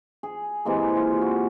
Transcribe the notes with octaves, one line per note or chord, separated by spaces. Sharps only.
G#4
C3 E3 G#3 A#3
F4
F#4